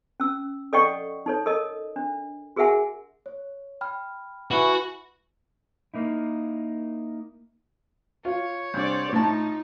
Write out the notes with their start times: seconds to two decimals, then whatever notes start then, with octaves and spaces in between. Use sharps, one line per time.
0.20 C#4 E6
0.73 A4 D5 D#5 F#5 G5 C#6
1.26 D#4 A4 C#5
1.46 A4 A#4 D#5
1.96 D4
2.56 F#4 G#4 A#4 E5 F#5 G#5
3.26 C#5
3.81 G5 B5 F6
4.51 E4 F#4 B4 G#5
5.94 A#3 D#4 E4
8.25 F4 C#5
8.74 C2 D4 C5 D5 C6 G6
9.13 A2 D#4 F4 A5